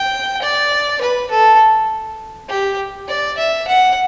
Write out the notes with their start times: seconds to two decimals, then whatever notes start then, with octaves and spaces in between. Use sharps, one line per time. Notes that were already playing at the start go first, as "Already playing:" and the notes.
Already playing: G5
0.42 D5
1.01 B4
1.31 A4
2.49 G4
3.08 D5
3.38 E5
3.67 F#5